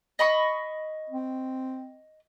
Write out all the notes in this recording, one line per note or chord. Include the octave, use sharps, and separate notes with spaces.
D#5 B5 C#6
C4